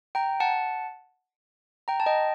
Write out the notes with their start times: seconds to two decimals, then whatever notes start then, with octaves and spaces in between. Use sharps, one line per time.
0.15 G5 A#5
0.40 F#5 A5
1.88 G5 A#5
2.00 A5
2.06 D#5 G5